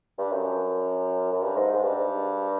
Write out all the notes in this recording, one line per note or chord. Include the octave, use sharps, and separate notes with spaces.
G2
F#2
F#2
G2
G#2
G#2
G2